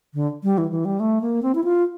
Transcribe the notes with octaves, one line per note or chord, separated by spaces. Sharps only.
D3
G3
E3
E3
G3
A3
A#3
C4
E4
F4